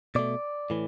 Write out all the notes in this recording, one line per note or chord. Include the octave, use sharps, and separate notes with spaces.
B2 A3 D5
A2 E3